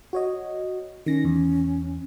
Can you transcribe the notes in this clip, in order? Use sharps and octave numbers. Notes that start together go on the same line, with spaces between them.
F#4 C#5 D#5
D#3 C#4 A#6
E2